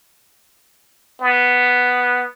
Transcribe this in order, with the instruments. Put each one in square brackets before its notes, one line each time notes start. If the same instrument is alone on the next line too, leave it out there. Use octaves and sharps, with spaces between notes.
[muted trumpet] B3